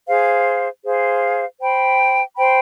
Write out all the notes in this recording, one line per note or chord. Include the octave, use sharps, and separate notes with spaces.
G#4 C5 F5
G#4 C5 F5
C5 G5 B5
C5 G5 B5